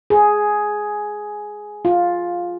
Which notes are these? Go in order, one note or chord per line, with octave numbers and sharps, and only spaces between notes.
G#4
F4